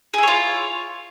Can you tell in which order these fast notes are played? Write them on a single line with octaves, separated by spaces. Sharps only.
G#4 E4 C#5 F4